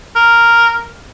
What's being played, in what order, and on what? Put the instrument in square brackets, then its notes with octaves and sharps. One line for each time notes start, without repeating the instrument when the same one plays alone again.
[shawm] A#4